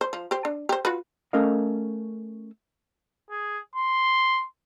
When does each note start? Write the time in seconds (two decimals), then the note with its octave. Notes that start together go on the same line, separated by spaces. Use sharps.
0.01 C5
0.13 F3
0.31 G4 C5
0.45 D4
0.69 G4 C5
0.85 F4 F#4 B4
1.33 A3 C#4 A4 A#4 D#5 F5
3.30 G#4
3.76 C6